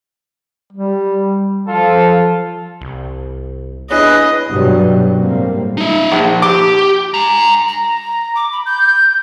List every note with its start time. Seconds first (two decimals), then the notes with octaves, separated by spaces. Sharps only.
0.72 G3
1.67 F3 F4 A4
2.81 C2
3.91 B3 D4 E4 G#4 B4 C#5 D#5
4.49 E2 G2 B2 F#3 G3
5.17 A2 G3 A#3 C4
5.78 D#4 E5
6.12 A#1
6.42 G4 D6
7.14 G#5 A#5
7.68 A#5
8.36 D6
8.52 B5
8.66 G6